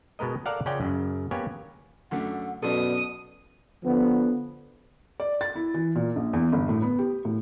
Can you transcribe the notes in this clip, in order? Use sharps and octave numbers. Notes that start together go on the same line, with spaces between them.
B2 G#3 B3 A#4 D#5
A4 A#4 D5 F5 F#5
C#3 C#4 F4 D5 F#5 G5
F#2 C#3
A#3 B3 G4 C#5 G#5
F#2 D3 A3 F#5
F#2 B2 A4 D5 D#6
D3 F3 B3
D5
A6
E4
E3
A#2
A#1
E2
G1
A2
B3
G4
A2